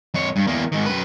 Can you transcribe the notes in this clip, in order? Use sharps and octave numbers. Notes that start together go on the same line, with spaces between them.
F2 C#5
G2
E2 A#3
G#2 D#3
F#2 B4